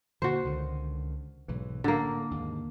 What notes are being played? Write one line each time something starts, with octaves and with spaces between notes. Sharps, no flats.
A#2 D3 F#4 C5
C#2 D3 D#3
B1 G#2 E3
A2 D3 A#3
D#2 G#2